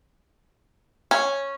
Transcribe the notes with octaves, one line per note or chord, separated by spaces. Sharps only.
C#4